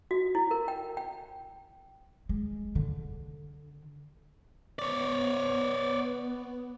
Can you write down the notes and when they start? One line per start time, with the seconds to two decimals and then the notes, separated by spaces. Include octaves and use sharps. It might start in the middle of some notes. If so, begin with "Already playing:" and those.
0.11 F#4
0.35 E4
0.51 A#4
0.68 G5
0.97 G5
2.29 G#3
2.75 D3
4.79 B3 C#5 D5